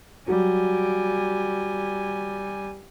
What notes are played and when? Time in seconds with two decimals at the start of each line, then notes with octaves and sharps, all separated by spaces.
0.28 F#3 G3 G#5